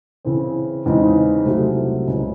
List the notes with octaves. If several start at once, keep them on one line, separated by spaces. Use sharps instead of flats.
C#3 E3 C4
E2 C#3 G#3 C4 D#4
C2 C3 F#3 A3 C4
C#2 C#3 G#3 C#4 E4